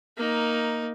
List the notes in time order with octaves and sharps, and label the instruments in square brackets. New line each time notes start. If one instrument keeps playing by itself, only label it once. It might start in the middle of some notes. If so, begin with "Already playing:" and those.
[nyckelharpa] A#3 D#4